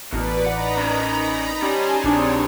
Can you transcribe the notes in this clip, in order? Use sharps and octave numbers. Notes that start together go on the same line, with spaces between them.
A1 B2 A#4 B4 D5
D#4 F#5 A#5 B5
C#4 D5
C#4 G4 D5 G#5 A5 C6
A#1 G3 C4 D4 D#4 G#4 C#5